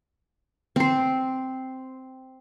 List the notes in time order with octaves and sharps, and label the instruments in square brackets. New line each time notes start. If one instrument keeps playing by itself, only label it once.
[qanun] C4 C5